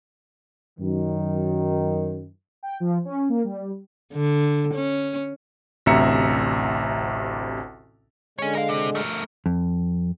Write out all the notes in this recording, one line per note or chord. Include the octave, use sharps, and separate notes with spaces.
F#2 D#3
G5
F3
C#4
A#3
G3
D3
C#4
A1 D2 C3 E5 A#5 C#7
D3 G#3 C#4 C#5
A#4 F5
C3
A3 A#4
F2